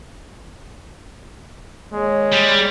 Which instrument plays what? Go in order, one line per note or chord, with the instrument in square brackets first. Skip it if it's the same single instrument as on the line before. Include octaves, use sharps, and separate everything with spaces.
[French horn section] D#3 A#3 C#5 [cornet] G#3
[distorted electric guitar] G3